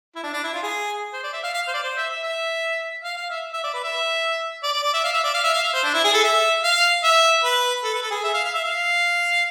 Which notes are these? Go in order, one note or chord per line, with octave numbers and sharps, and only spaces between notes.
E4
D4
D4
E4
F4
G#4
C5
D5
E5
F5
F5
C5
D5
C5
E5
E5
E5
F5
F5
E5
E5
D5
B4
E5
D5
D5
D5
E5
F5
E5
D5
F5
E5
F5
E5
C5
D4
E4
G#4
A4
E5
F5
E5
B4
A4
B4
A4
G#4
E5
F5
F5
E5
F5